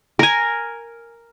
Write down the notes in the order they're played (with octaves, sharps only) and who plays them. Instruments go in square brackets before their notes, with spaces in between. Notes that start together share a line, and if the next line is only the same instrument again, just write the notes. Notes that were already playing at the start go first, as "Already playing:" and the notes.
[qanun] A#4 G#5